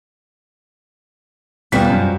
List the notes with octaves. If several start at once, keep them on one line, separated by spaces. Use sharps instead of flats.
E2 B2 F3 G3 F#4 B6
F#2